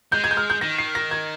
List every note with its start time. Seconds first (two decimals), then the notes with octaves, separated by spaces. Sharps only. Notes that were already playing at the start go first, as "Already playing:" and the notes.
0.12 G#3 G6
0.24 G#6
0.31 G6
0.37 F6
0.50 G6
0.61 D#3 A#6
0.79 C7
0.95 A#6
1.11 G#6